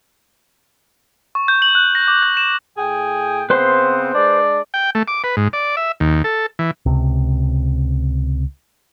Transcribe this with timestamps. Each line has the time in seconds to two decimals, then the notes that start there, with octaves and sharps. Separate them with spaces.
1.35 C#6
1.48 G6
1.62 F#7
1.75 F#6
1.95 A#6
2.08 D6
2.23 G6
2.37 E7
2.78 A2 G#4 G5
3.50 C#3 B3 C4 B4 C5 C6
4.14 G#3 D4 D5
4.74 G5
4.95 A3
5.08 D6
5.24 B4
5.37 G#2
5.53 D5
5.77 E5
6.00 D#2
6.24 A4
6.59 E3
6.86 C#2 C3